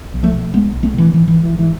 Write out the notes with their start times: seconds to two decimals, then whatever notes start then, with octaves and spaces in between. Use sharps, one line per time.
0.14 B1
0.23 F3 A3
0.33 B2
0.53 B1 G#3 B3
0.73 B1
0.83 A3 C4
0.94 B2 E3
1.13 G#2 E3
1.28 G#1 E3
1.43 E3
1.54 G#2
1.59 E3